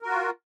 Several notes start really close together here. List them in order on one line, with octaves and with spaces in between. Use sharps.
A#4 F#4 F4